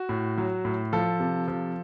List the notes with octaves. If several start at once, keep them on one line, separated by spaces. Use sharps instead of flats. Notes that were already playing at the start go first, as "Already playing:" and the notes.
Already playing: F#4
A2
F#3
A2
F3 A4
C3
F3